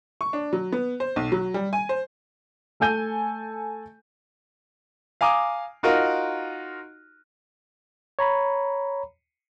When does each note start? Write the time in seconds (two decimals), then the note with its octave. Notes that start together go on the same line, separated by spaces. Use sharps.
0.21 C#6
0.33 D4
0.53 F#3
0.72 B3
1.00 C5
1.16 B1
1.32 F#3
1.54 G3
1.73 G#5
1.89 C5
2.80 A3 A4 G#5 G6 D#7
5.21 F5 G#5 A#5 D6 D#6
5.83 D#4 F4 F#4 A#4 D#5
8.19 C#5 A#5 B5